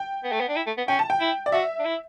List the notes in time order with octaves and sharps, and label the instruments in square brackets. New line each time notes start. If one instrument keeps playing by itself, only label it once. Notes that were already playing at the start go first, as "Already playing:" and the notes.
Already playing: [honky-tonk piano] G5
[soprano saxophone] B3
A3
B3
D4
E4
A3
B3
[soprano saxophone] C#4 [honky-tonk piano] G5
[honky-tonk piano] A5
G5
[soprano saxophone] E4
[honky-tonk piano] D5
[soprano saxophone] F#4 [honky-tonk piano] E5
[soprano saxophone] D4
E4